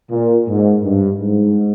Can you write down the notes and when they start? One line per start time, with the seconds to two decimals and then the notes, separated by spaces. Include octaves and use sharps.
0.11 A#2
0.48 G#2
0.83 G2
1.20 G#2